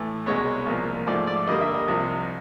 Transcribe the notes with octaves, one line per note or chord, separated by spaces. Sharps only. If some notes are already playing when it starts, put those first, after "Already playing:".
Already playing: A2 E3 A3
C2 B2 G#3 B3 C#5
C2 A#2 F3 A#3
G#2 F3 A3 D5
D5
G2 D3 G3 A#3 D#5
E5
D#5
C2 C3 F3